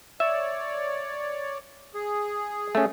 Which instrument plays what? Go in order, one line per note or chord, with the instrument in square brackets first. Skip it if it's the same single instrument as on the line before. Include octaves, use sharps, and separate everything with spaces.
[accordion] C#5 D5 [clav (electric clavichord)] E5
[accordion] G#4
[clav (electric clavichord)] A3 C#4